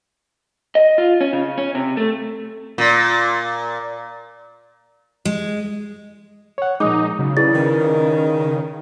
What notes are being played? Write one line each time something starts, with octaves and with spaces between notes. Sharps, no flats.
D#5
F4
C#4
C#3
C#4
C3
A3
A#2
G#3
C#5 F#5
A#2 F3 G#3 D#4 D6 D#6
C#3 F#3
E4 G#4 B4 D5 A6
D#3